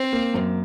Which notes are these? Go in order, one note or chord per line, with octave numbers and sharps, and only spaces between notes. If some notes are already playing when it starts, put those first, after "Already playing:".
Already playing: C4
A#3
F#2